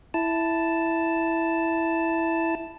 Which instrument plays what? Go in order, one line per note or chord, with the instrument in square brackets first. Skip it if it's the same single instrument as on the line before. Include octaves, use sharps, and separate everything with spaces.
[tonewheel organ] E4 A5